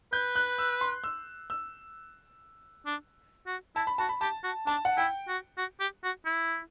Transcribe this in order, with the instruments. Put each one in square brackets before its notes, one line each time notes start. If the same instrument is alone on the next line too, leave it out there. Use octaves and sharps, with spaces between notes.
[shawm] B4 [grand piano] G6
[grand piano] F#6
E6
C6
E6
E6
[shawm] D4
F#4
[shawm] E4 [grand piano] A5
[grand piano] B5
[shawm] F#4 [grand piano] A5
[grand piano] B5
[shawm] G4 [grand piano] A5
[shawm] F#4
[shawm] D4 [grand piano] A5
[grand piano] F#5
[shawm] E4 [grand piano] G5
[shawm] F#4
F#4
G4
F#4
E4